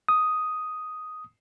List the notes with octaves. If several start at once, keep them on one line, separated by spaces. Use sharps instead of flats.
D#6